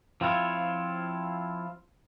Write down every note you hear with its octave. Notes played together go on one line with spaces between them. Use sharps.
F3 C4 E4 F4 C#5